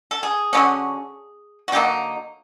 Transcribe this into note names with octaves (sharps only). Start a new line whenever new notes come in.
A4
G#4
D3 F#3 A#3 C#4
F#4
D3 F#3 A#3 D#4 G4